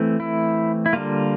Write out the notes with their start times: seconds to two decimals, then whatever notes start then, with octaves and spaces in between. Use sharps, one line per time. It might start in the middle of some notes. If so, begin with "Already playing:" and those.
Already playing: E3 A3 C4
0.20 E4
0.86 E4
0.93 D3 G3 A#3 F4